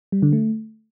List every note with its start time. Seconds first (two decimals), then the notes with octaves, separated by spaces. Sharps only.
0.12 G3
0.22 D3
0.33 A3